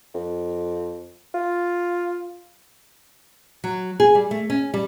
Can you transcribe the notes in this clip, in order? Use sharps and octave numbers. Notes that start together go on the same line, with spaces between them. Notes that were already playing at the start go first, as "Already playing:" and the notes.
F2
F4
F#3
G#4
G3
A3
C#4
G3